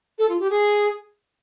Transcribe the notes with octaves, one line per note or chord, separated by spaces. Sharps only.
A4
F4
G4
G#4